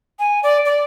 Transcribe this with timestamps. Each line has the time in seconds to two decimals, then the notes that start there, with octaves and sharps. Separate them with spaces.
0.19 G#5
0.43 D5
0.65 D5